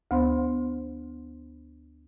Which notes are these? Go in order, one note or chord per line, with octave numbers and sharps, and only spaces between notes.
D2 B3 C5 C6